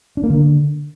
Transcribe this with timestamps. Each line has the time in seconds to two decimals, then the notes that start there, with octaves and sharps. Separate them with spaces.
0.17 D4
0.24 A#3
0.30 D3